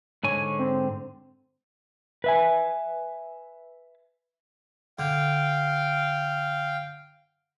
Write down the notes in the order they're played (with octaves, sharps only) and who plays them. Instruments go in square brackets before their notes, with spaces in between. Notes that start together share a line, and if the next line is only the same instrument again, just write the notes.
[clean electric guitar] G#2 D3 G#5 [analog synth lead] C#5
[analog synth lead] C4
[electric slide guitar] B4 E5 G#5
[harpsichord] D3 [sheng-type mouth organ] F5 G5